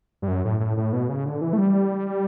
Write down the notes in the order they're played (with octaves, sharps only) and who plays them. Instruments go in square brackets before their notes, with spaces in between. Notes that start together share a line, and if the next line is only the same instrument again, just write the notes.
[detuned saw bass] G2
F#2
A2
A2
A2
B2
C#3
D3
E3
A3
G3